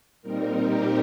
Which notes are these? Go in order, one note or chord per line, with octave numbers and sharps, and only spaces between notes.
A#2 G3 C4 D#4 A#4
G4